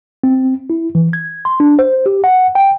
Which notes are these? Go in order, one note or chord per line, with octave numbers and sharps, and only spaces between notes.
C4
E4
E3
G#6
C6
D4
C5
G4
F#5
G5